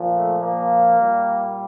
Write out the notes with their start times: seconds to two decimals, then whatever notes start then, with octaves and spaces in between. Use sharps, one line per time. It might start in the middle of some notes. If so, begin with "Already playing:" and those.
Already playing: A#2 F3
0.12 A3
0.40 A#3
0.97 A#2 G3